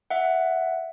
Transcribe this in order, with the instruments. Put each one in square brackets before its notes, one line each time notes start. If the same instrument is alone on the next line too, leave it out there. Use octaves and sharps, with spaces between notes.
[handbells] E5 F#5